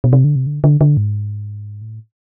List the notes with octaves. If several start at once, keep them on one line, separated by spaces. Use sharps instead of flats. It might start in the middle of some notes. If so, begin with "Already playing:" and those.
B2
C3
D3
C3
D3
D3
D3
G#2
A2